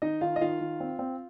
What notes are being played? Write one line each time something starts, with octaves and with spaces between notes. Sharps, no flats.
D#3 D#4 D#5
D#3 F4 F5
D#5
D#3 F4 F5
D#3
C4
C4